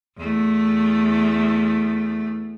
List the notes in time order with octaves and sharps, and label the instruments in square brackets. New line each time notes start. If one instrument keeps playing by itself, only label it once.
[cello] E2 A3